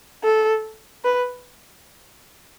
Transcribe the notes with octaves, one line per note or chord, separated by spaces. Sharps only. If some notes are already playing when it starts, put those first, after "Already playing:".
A4
B4